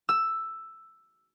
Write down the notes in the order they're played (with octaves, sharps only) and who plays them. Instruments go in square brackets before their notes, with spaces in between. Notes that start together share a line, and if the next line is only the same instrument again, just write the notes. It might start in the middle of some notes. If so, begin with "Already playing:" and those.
[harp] E6